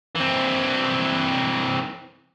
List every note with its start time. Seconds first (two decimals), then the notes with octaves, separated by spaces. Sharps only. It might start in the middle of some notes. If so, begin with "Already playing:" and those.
0.16 E3 C4